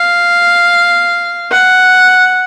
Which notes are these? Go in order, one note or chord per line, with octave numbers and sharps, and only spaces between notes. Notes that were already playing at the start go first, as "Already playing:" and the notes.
Already playing: F5
F#5